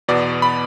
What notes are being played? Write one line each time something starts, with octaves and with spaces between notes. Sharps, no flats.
E2 B2 B3 D5
B5